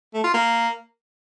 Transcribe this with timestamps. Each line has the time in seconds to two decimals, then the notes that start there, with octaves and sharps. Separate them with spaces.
0.14 A3
0.24 F4
0.34 A#3